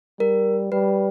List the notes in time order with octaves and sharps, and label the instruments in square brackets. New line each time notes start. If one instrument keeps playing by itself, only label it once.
[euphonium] G3 [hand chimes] A#4
[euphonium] G3 [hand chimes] B4